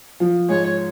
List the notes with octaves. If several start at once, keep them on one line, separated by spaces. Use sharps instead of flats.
F3
G#2 G#3 C#5